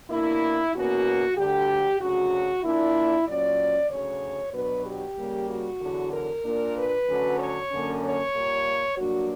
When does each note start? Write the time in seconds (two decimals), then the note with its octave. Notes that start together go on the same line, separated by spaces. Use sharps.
0.10 B2 A#3 D4 E4
0.74 E2 B2 A#3 C#4 F#4
1.37 D2 D3 G3 G4
2.01 D2 C#3 F#3 F#4
2.64 A#2 A#3 D4 E4
3.27 A#2 F#3 C#4 D5
3.90 D2 C#3 F#3 C#4 C#5
4.54 B2 F#3 B3 D4 B4
4.85 G4
5.18 C#3 G3 A#3
5.49 F#4
5.80 E2 D3 F#3
6.12 A#4
6.44 A#2 A#3 D4
6.76 B4
7.07 D2 D3 F#3 C#4
7.39 C#5
7.71 F#2 D3 A#3 C#4
8.02 C#5
8.34 A#2 G3 A#3
8.97 G2 F#3 A#3 D4 F#4